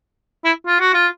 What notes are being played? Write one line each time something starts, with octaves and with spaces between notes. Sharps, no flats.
E4
F4
F#4
F4